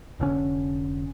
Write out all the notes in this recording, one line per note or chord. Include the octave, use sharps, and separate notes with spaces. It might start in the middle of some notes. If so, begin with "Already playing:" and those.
F1 D3 C#4